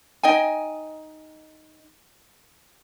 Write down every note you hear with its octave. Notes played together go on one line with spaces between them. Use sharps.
D#4 D#5 G5 G#5